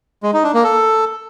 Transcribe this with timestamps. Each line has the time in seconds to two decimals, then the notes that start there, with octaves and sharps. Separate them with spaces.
0.23 G#3
0.33 D#4
0.44 D4
0.54 A#3
0.64 A4